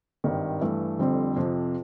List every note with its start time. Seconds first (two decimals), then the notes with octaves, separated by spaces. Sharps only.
0.24 G#1 G2 D#3 G3
0.61 G2 E3 A3
0.98 F1 F2 D3 G3 C4
1.36 F2 C3 F3